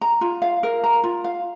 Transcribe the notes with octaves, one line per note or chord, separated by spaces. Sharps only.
A#5
F4
F5
A#4
A#5
F4
F5